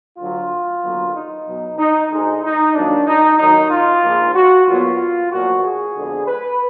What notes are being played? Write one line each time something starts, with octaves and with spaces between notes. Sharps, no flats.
D2 D3 F#3 F4
D#2 D3 F#3 B3
D#4
B1 B2 F#3
D#4
D2 D3 G#3 D#4
D#4
F2 D#3 F#3 A#3 D4
D#4
D#2 D#3 F#3 D#4
F4
A#1 G#2 F3 A#3
F#4
A#1 A#2 F#3 B3 F4
B1 A#2 F3 F#4
G#4
F2 D3 G#3 B3
B4